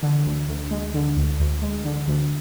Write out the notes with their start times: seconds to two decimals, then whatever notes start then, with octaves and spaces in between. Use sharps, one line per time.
0.03 D3
0.26 D2
0.49 D2
0.71 G#3
0.94 D3
1.17 D2
1.40 D2
1.62 G#3
1.85 D3
2.08 D2